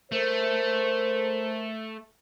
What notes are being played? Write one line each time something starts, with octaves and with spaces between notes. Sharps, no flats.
A3 A#4 C5